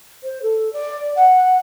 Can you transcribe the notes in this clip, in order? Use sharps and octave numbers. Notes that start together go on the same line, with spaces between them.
C5
A4
D5
F#5